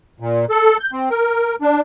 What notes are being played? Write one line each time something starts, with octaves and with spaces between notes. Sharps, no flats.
A#2
A4
G6
C4
A#4
D4